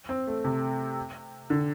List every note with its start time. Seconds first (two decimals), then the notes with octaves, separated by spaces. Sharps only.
0.09 C4
0.27 A3
0.44 C3
1.50 D3